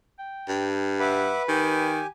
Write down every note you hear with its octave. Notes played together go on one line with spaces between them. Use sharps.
G5
G2
B4 E5 F#5 D6
D#3 G4 G#5